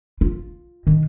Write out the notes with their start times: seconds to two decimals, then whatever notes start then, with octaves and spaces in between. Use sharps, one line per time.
0.21 F4
0.87 D#3